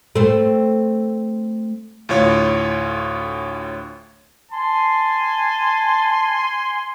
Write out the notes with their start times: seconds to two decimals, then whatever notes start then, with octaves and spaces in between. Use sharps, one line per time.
0.15 A3 C4
2.09 D2 A2 F4 C#5
4.51 G#5 A5 C6